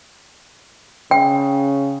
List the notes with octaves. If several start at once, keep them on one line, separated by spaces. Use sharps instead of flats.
C#3 G5